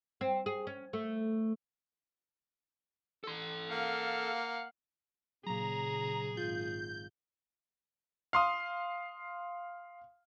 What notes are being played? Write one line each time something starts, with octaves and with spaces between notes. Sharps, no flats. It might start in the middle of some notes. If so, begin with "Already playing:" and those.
C4
G#4
C#4
A3
A4 C6
A#3 F5 F#5
A#2 C#3 F#3 G#4 A#5
G#1 F4 G6
F5 C6 D#6